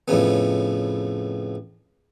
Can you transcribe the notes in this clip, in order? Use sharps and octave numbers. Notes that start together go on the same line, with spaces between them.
F2 A2 C#3 B3